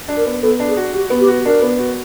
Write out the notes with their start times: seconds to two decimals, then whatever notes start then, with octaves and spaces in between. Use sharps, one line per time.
0.08 D4
0.17 A#4
0.25 B3
0.42 B3 A4
0.60 D4
0.68 G#4
0.77 F#4
0.93 F#4 G4
1.10 B3
1.20 G4
1.28 F#4
1.45 D4 A#4
1.62 B3
1.79 F#4